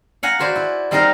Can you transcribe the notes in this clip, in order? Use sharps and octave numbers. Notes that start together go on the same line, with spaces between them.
F5 F#5 G#5 A#5
F#4 B4 C5 D5 G#5
E4
G3 C4 D#4 F4 A#4 F5